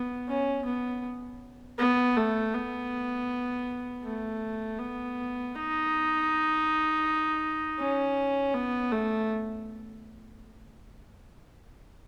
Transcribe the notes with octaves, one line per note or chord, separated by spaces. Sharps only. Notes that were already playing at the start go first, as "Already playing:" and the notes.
Already playing: B3
C#4
B3
B3
A3
B3
A3
B3
D#4
C#4
B3
A3